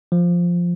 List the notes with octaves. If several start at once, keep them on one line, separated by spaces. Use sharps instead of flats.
F3